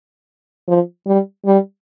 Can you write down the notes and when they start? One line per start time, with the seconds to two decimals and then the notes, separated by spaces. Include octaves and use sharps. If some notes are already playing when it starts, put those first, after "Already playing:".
0.68 F3
1.06 G3
1.46 G3